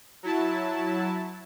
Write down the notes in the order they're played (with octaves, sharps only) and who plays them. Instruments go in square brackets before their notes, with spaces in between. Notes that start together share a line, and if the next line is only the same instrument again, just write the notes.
[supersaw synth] F#3 E4 A5